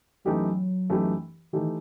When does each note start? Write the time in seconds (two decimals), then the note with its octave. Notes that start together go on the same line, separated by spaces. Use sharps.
0.25 F#2 E3 F#3 A3 D#4 G4
0.90 F#2 E3 A3 D#4 G4
1.53 D#3 E3 A3 D#4 G4